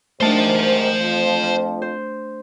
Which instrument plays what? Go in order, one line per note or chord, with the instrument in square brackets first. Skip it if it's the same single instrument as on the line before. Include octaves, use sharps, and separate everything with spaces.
[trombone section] G#2 C3 D#3 [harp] A3 D4 [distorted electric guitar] C5 A5
[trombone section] F2 F3
[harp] C5